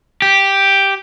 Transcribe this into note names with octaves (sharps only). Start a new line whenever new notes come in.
G4